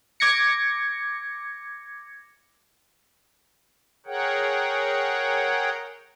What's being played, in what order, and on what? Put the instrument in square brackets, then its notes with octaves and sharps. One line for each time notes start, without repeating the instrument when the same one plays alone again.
[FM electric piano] D6 G#6 A#6 C#7
[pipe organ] G#4 A#4 C#5 F#5 G5